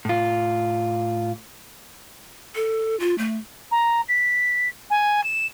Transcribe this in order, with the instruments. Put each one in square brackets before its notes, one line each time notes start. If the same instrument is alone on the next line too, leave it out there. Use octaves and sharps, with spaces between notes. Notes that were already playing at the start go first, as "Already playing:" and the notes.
[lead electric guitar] A2 F4
[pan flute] A4
F4
A3
[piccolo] A#5
B6
G#5
E7